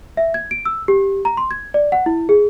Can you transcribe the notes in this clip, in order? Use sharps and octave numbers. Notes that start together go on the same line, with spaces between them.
E5
G#6
D7
E6
G4
A#5
C6
G#6
D5
F#5
E4
G#4